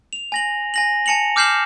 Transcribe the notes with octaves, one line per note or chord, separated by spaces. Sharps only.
F7
G#5 A#6 F#7
G#5 A#6 F#7
G#5 A5 C#7 F7 F#7
D6 F6 G6 C7 E7 F#7